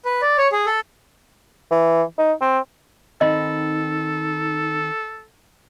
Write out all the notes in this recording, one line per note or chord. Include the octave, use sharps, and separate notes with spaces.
B4
D5
C#5
G#4
A4
E3
D#4
C4
D#3 C4 D#4 A4 D#5 B5